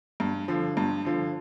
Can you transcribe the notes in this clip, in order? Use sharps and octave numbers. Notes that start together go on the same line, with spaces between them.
G2
D3 F3
G2
D3 F3